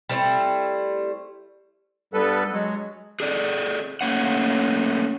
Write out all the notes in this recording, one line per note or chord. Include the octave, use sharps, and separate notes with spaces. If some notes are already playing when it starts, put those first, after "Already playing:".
G3 A3 C4 E4
G2 G3 B3 A4 B4
F#3 G#3
G#4 A4 D5
A3 A#3 C#4 F#5